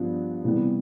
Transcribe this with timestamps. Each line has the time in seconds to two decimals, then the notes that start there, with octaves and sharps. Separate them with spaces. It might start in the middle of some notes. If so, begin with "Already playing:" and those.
Already playing: G2 F3 B3 D4
0.44 C3 E3 G3 B3